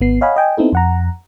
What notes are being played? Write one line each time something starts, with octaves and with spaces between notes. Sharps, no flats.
G#1 B3 C7
C#5 D#5 F5 F#5 G#5 B5
D#5 G5 G#5
B3 C4 D#4 E4 A4
F2 F#5 A#5